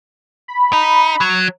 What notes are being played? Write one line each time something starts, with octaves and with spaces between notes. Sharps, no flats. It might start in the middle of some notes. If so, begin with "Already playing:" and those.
B5
D#4
F#3